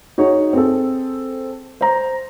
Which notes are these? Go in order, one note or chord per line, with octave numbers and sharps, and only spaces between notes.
D#4 F#4 G#4 C#5
C4 G#4 A4
C5 A#5